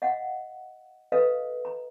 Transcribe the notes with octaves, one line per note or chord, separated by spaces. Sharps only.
D#5 F5 F#5
A4 B4 D#5 F5
A#5